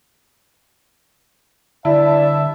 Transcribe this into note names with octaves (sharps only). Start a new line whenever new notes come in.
G2 D3 E4 D5 E5 A5